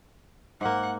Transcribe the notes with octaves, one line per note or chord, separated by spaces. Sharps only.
G#2 A#3 F#5